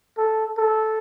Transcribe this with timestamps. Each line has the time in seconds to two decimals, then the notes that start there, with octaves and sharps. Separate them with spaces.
0.18 A4
0.58 A4